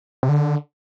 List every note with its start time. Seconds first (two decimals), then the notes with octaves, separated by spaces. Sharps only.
0.23 C3
0.29 D3